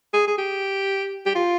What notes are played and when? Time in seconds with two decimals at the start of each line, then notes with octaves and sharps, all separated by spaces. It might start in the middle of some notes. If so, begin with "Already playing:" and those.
0.13 G#4
0.27 G#4
0.38 G4
1.26 G4
1.35 F4